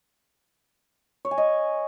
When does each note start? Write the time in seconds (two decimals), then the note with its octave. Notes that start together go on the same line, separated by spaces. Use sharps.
1.25 C#5
1.31 G#5
1.38 D#5